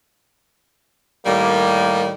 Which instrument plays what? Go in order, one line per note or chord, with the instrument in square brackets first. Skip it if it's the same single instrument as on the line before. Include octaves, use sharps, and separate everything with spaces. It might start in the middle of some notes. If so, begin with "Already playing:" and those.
[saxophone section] A2 D#3 G3 [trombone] A#3